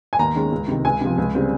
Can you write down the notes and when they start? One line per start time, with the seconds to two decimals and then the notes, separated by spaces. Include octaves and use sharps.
0.13 G#5
0.19 D#2 A#5
0.35 D#3 G#3 C#4
0.52 C#2
0.68 C3 D#3
0.85 C#2 G#5
1.01 C3 F3
1.18 C#2
1.35 C#3 G3 C4